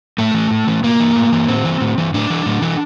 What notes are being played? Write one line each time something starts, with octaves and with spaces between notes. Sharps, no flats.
A2 A3
E3
A2
E3
A2 A#3
E3
A2
E3
A2 C4
E3
A2
E3
A2 D4
E3
A2
E3